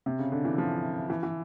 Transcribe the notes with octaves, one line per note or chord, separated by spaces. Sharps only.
C3
C#3
D3
E3
F3
E3
E3